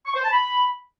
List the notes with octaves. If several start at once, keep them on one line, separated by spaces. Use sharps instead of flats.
C#6
C5
A5
B5